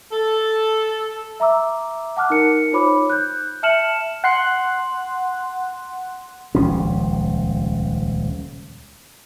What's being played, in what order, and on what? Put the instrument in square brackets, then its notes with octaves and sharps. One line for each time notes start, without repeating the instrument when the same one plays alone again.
[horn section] A4
[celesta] E5 A#5 D6 E6
F#5 A5 D6 F6 F#6
D#4 A#4 C#7
D#4 F4 C5 C#5 B5 D6
F#6 G6
E5 A5 F6 C#7 E7 F#7
[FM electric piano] F#5 C6 F#6
[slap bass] D#1 C#2 F3 C#4